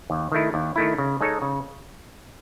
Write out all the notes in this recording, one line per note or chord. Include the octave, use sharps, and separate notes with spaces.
D#2
D#3 A3 E4
D#2
D#3 A3 E4
C#3
G#3 D#4 A4 C#5
C#3